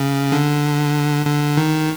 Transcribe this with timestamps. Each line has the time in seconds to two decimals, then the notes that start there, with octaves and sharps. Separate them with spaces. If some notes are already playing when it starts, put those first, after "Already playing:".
Already playing: C#3
0.32 D3
1.25 D3
1.57 D#3